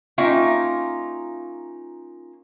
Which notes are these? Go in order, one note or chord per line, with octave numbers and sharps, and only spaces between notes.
A#3 C#4 D#4 F4 E5 G5